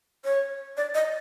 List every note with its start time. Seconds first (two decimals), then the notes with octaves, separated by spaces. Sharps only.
0.24 C#5
0.77 D5
0.94 D#5